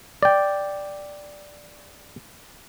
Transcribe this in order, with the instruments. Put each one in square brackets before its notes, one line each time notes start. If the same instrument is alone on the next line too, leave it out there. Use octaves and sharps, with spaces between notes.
[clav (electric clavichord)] D5 G5